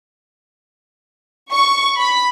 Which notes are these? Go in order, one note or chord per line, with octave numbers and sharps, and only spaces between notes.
C#6
B5